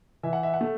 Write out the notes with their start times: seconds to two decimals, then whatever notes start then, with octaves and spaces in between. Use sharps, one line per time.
0.23 E3 E5
0.33 F#5
0.43 E5
0.54 F#5
0.61 A3